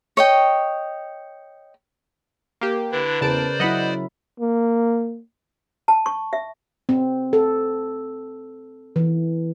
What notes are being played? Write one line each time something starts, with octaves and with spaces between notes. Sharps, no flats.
C#5 D#5 G5
A#3 G4
D3 D4 E4 B4
E2 C#3 A#4 C5 D5 A5 D7
F#3 E4 D#5 F#5 B5
A#3
A5
C#6
E5
C4
A4
E3